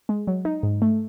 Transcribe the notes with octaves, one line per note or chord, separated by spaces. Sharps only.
G#3
F#3
D#4
G#2
A3